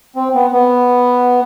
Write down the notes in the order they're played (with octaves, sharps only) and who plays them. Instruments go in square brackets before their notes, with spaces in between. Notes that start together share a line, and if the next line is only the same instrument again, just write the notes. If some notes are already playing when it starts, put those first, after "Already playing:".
[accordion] C4
B3
B3